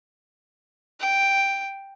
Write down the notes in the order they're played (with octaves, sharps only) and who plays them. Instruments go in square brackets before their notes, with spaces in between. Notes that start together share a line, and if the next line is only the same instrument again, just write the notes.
[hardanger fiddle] G5